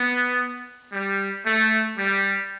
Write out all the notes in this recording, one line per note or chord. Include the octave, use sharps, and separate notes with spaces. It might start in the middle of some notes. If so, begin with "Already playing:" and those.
Already playing: B3
G3
A3
G3